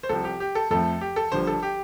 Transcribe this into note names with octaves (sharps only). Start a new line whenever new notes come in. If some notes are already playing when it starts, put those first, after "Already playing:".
C5
C2 C3 F3 C4 A4
G4
G4
A4
F2 F3 A3 C4 A4
G4
A4
G1 G2 F3 C5
A4
G4